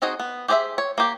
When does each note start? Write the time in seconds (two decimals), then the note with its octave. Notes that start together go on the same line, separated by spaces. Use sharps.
0.02 C4 D#4 F#4 G#4 D#5
0.20 B3
0.48 G4 G#4 C5 D#5 E5
0.78 C#5
0.98 A#3 G4